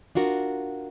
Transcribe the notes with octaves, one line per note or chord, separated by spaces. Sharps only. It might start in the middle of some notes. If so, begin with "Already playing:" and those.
D4 F4 F#4 A#4